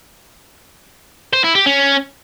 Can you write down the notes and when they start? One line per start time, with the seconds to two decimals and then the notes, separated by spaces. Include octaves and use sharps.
1.33 C5
1.44 E4
1.55 G4
1.66 C#4